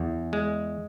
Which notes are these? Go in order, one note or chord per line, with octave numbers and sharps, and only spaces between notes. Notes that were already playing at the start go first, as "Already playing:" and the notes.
Already playing: E2
G#3